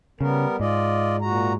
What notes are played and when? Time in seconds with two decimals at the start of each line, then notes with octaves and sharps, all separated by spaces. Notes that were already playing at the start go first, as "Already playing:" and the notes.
0.21 C#3 G3 B3 A#4
0.60 G#2 F4 D5 D#5
1.22 A#2 F#4 A#5